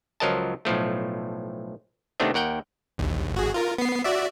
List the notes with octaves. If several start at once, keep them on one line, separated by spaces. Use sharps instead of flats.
C#2 F3 F#3 A#4 D#5 A5
B1 A2 F3 A3
C3 D#3 A3 B3 C4 D4
D#2 A#4 F#5 G5
A#1 D#2
G#1 F#4 G#4
F4 A#4
B3 C7
F#4 D5 E5